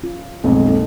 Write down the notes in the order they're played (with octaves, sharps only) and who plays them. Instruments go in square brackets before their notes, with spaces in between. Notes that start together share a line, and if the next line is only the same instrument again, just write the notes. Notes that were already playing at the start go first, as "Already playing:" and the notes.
[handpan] C#4 F4
[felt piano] B1 F2 G#2 [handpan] B2 A3
[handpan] A#3 D#4 A4